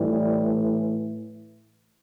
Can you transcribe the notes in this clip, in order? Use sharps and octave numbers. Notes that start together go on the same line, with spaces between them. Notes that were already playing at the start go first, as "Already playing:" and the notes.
Already playing: A2 E3 G3